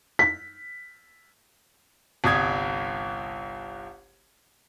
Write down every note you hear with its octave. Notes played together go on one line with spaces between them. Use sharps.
B6
G1 C2 D#6 G#6